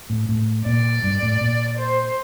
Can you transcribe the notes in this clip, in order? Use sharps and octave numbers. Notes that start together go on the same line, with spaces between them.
A2
A2
A#2 D5
G2
A2
A#2
C5